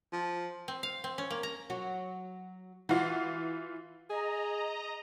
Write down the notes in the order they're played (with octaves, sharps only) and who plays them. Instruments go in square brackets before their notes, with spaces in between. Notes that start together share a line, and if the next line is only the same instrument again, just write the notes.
[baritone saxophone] F3
[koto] C4
F5
C4
C#4
A#3
A#5
[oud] F#3 F#4
[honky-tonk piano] E3 F4 [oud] F#4
[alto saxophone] G#4 [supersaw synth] D#5 A#5